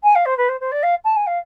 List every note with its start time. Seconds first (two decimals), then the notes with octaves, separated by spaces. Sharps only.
0.03 G#5
0.15 F5
0.25 C5
0.37 B4
0.48 C5
0.60 C5
0.71 D5
0.82 F5
1.04 A5
1.16 G#5
1.26 F5